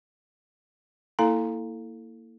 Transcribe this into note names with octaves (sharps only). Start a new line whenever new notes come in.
A#3 E4 A4 F5 A#5